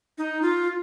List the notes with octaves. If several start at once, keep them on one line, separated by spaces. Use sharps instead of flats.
D#4
F4